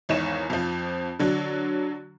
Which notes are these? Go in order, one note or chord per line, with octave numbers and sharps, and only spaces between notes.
G#1 E2 D#4 C#5 E7
F2 F3
D3 F#3 D4